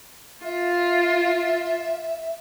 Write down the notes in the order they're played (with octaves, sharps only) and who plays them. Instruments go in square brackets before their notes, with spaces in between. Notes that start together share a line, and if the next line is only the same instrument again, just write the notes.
[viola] F4 [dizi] E5